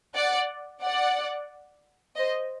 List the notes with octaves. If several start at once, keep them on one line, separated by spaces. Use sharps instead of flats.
D5 F#5
D5 F#5
C5 D#5